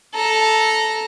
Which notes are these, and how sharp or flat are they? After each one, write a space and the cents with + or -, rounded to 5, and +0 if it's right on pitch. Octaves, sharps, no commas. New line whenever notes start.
A4 -5 A#5 +0